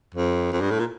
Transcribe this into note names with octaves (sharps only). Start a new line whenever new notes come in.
F2
F2
G2
A2
A#2